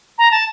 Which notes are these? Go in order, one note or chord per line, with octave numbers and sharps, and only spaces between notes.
A#5
A5